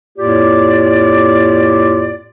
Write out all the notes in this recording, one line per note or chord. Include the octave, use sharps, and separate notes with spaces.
F2 A2 A#3 F4 G4 D5